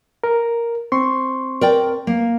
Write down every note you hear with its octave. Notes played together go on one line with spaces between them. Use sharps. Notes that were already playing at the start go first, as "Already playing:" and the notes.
A#4
C4 C6 C#6
A#4 D5 G5
A#3